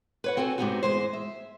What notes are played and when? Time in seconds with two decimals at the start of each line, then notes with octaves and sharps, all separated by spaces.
0.24 B4 C#5 F#5
0.37 C4 F#4 A4 G#5
0.58 G#2 C3 A3 B3 D#4 F#4
0.83 E2 G#3 C5
1.13 E5